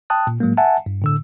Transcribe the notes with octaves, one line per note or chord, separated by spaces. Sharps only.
G5 A5 D#6 F#6
A#2
A2 F#3 G#3 A#3
E5 F#5 G#5 A5
G2
A2 D3 E6